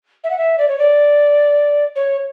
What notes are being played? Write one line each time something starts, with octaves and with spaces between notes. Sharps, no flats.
E5
F#5
E5
D5
C#5
D5
C#5